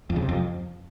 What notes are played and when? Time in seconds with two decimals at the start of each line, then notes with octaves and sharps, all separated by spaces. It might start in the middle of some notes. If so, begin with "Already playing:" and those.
0.10 F2
0.16 C#3
0.22 C3
0.29 F2